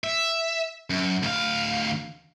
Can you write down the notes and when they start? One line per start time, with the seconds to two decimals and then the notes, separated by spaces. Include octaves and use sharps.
0.04 E5
0.90 F#2
1.23 D2 F5